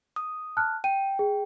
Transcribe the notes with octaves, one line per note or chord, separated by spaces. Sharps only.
D#6
A5 F6 F#6
G5 D#7
G#4